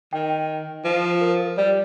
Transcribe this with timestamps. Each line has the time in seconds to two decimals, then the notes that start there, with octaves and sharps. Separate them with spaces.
0.13 D#3 G5
0.85 F3
1.21 A#4
1.39 A#4
1.57 G3 D5